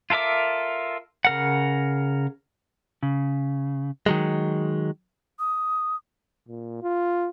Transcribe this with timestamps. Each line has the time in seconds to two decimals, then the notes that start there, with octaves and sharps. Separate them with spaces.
0.10 F4 A4 A#4 E5 D6
1.25 C#3 A#4 F#5
3.03 C#3
4.06 D#3 F#3 G#3
5.40 D#6
6.49 A#2
6.82 F4